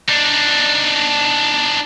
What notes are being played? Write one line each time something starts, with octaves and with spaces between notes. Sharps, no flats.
D4 D#4